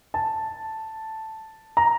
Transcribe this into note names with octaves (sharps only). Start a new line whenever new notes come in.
A5
A#5